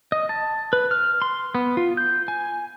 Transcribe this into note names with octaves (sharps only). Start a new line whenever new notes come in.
D#5
A5
B4
F6
C6
B3
F4
G6
G#5